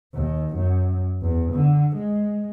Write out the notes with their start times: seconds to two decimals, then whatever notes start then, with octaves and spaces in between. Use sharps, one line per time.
0.14 D#2
0.56 F#2
1.22 E2
1.52 D3
1.96 G#3